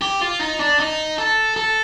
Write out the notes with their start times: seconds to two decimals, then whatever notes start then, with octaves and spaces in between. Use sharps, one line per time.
0.02 G4
0.21 F4
0.41 D#4
0.60 D4
0.80 D#4
1.18 A4
1.57 A4